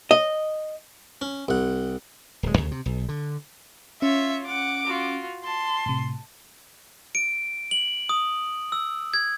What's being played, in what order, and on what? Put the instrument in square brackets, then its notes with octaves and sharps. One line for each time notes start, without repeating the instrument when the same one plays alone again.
[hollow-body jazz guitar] D#5
[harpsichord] C#4
C2 F#5
[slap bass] D1 G#3
D2 C#3
C3
B1
D3
[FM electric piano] C#4 [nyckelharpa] F4 C#5 [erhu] E5
[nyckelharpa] F#5 [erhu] D6
[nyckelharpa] F4 F#4
[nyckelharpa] A5 [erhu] C6
[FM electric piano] A2 C3
[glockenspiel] D7
F#7
D#6
E6
G#6